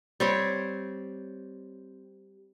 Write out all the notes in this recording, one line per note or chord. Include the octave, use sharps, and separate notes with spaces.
G3 C4 C#5